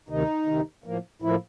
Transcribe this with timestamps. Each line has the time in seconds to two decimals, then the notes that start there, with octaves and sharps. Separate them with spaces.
0.09 D2 C3 D#3 D#4
0.47 D2 C3 D#3
0.84 A2 F3 A#3
1.22 A2 F3 A#3 E4